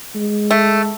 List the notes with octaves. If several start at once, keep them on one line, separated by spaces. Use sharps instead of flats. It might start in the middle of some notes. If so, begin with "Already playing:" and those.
G#3
A3